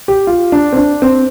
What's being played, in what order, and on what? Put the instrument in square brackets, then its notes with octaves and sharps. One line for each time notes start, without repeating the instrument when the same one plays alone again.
[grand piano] G4
F4
D4
C4
D4
C4